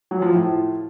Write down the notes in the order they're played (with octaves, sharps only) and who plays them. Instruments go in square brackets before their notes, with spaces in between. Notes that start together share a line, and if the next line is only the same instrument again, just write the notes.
[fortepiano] F#3
F3
A2